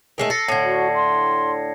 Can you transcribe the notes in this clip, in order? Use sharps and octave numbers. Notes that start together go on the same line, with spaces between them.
D#3 G#3 A3
A4 A#6 C7 C#7
A2 D3 A5 G#6
F#4
C6